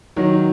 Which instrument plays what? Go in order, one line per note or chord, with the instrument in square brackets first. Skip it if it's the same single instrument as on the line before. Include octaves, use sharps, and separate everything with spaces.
[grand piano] D#3 F#3